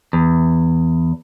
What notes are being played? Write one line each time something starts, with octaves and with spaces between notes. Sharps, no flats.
E2